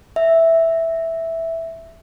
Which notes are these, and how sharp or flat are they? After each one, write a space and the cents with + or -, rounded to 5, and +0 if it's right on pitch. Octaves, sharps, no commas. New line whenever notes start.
E5 -5